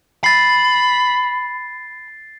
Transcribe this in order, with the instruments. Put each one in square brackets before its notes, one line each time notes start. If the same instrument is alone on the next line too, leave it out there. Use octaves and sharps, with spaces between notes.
[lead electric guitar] B5 [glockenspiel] A6 C7